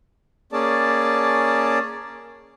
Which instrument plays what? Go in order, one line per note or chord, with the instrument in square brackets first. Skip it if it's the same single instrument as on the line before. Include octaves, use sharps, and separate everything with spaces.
[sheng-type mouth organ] A#3 C#4 G#4 D5 A5